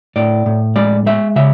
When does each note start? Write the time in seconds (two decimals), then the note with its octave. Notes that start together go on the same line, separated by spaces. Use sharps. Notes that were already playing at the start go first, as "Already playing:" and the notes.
0.16 A2 D5
0.46 A2
0.76 G#3 D5
1.06 G#3 E5
1.36 C#3 E5